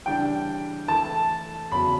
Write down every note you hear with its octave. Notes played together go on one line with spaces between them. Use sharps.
C#3 E3 G3 D4 G5
E3 A3 E4 A4 A5
E2 C#3 F#3 B5